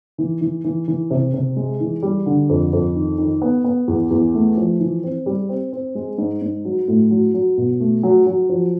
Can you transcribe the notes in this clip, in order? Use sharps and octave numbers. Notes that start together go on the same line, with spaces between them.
E3
E3
E3
E3
C3
C3
G#3
E3
G3
D3
F2
F2
D#3
D#3
B3
B3
E2
E2
A3
F3
E3
C4
G3
C4
C4
G#3
G#2
G#2
F#3
A2
F#3
F#3
B2
A3
F#3
F#3
F3